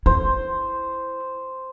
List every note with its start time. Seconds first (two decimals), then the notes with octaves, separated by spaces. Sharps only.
0.06 E4 C5